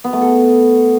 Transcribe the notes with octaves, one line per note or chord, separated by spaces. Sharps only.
B3
A3
A4